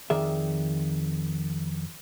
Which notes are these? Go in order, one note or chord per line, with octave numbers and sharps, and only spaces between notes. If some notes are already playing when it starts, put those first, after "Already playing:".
F2 D#3 G#4 D5 E5